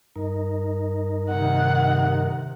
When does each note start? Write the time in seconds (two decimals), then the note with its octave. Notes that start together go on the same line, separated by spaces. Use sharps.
0.16 G2 D#4 A#4
1.30 C3 D#3 F#5